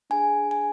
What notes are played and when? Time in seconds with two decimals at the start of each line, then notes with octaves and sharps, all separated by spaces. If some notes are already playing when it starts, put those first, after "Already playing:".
0.10 D4 G#4 G#5
0.51 G#5